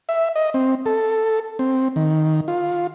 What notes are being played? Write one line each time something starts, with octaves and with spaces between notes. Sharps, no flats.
E5
D#5
C4
A4
C4
D#3
F4